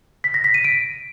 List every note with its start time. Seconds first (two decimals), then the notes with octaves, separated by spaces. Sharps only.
0.24 B6
0.34 A#6
0.44 B6
0.54 D#7
0.64 D7